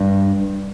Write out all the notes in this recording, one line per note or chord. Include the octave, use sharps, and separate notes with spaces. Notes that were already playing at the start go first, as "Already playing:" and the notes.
Already playing: G2